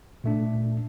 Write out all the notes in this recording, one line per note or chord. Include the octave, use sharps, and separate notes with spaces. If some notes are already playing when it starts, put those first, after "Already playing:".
A#2 A3 D4